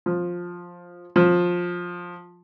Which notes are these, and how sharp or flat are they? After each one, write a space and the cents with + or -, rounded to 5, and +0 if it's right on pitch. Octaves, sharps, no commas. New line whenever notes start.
F3 +10
F3 +15